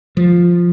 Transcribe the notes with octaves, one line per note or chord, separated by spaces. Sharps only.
F3